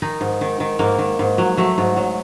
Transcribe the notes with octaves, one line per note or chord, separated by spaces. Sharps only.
D#3 D#4
G#2
D#3
D#3
G#2 A#3
D#3
G#2
F#3
F#3 A3
G#2
F#3